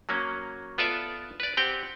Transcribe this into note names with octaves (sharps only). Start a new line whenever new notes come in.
F#3 A#3 C#4
B3 F4 A4 B4 D5 E5
B4 D5
C4 G4 F#5 G5